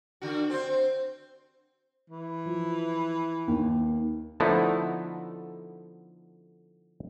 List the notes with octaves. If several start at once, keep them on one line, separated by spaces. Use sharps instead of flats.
D3 F#4
C4 C5
E3
F3
D#2
D3 F3 A3 B3 D#4 E4